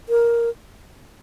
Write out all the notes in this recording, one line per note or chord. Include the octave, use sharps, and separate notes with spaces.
A#4